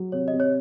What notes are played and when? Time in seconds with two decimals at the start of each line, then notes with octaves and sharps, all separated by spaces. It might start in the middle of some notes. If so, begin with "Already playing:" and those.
Already playing: F#3
0.12 C3 C#5
0.28 D#5
0.33 C3
0.40 C#5